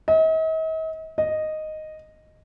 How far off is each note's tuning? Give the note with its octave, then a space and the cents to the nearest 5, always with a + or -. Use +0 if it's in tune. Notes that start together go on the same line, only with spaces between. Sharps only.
D#5 +45
D#5 -5